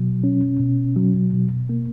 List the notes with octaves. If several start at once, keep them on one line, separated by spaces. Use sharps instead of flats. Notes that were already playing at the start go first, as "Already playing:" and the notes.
Already playing: B2 F#3
C#4
B2
F#3
B2
A#3